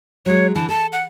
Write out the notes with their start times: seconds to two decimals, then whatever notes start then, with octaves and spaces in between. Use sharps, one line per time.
0.26 F#3 G#3 C#5
0.55 D3 E3 A5
0.69 A4 A5
0.93 F#5